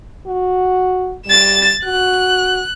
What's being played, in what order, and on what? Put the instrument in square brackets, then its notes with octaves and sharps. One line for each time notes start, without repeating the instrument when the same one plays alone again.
[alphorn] F#4
[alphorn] G3 [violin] A6 E7
[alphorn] F#4 [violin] F#6